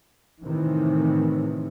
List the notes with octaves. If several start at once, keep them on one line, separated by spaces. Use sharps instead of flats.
A2 C3 D#3 E3